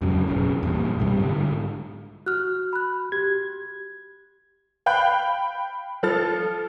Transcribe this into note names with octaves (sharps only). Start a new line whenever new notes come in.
F2 G#2 C#3 F#3
F#1 B1 C#3
E2 G2 A#2
B1 G2 C3 G3
G#2 D3
F#4 F6 F#6
B5 F#6
G4 G#6
F5 G5 B5 F#6 G6
F3 A4 F6 A6